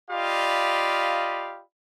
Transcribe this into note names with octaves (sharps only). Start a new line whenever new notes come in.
F4 G4 D5 D#5 F5 B5